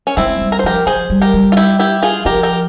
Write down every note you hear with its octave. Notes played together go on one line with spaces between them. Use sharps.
C#4
G#3 C4 E4
G3
A#4
C5
F3 G4 A#4
F3 G#4 C5
G3
G4 A#4
G3
F4
E4 G4
E4 G4
F4 G#4
F3 G4 A#4
G4 A#4